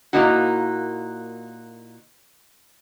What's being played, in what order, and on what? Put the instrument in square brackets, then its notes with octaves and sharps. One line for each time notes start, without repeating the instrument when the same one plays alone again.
[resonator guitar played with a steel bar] A#2 D#3 A#3 D#4 E4 F#4